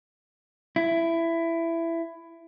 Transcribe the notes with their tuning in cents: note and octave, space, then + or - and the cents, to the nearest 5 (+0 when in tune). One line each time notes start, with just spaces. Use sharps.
E4 +15